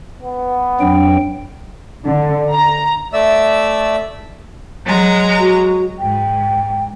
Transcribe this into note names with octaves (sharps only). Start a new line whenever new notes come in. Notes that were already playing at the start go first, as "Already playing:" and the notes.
B3
F2 F#3 D4 G5
D3
A#5
A3 D5 E5 E6
F#3 G#3 A#5
F#4
G#2 G5